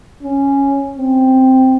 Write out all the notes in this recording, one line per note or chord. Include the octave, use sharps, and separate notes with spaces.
C#4
C4